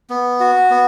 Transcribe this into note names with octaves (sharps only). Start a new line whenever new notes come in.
B3
F#4
B3